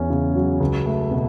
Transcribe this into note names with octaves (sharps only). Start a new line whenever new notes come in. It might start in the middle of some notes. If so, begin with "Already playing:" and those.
Already playing: E2 C#4
C#3
F#3
C#2
A3
B2